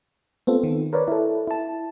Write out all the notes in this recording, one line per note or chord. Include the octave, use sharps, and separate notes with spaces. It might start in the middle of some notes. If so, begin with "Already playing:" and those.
B3 C4 F4 A4
D#3
A#4 B4 C#5 D5
E4 A4
E4 A5